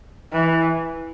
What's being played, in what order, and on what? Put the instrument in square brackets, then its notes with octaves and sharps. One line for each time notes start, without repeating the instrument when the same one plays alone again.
[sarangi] E3